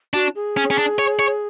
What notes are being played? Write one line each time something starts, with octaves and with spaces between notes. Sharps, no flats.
D4 F#4
G#4
C#4
C#4
D4
C#5
C#5